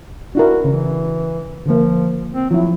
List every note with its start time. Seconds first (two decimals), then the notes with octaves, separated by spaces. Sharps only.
0.35 D4 E4 F#4 A#4
0.64 C#3 E3
1.66 D3 F3 A#3
2.34 C4
2.51 F3 F#3 E4